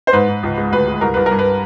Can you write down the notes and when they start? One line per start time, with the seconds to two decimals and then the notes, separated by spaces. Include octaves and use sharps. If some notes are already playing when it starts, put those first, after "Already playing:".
0.07 C5
0.13 G#2 B4
0.28 G#2
0.43 C#2
0.58 G#3
0.72 D2 B4
0.87 G#3
1.01 C2 A#4
1.14 C2 B4
1.26 A#4
1.31 G2
1.39 B4